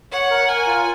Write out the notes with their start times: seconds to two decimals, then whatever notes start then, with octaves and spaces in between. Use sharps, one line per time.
0.12 C#5 F#5
0.30 A#4
0.48 A#4 G#5
0.67 F4